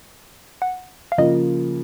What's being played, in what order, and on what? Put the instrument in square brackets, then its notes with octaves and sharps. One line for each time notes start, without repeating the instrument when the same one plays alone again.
[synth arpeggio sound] F#5
F5
[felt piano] C#3 F3 A#3 F4 [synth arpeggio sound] D#5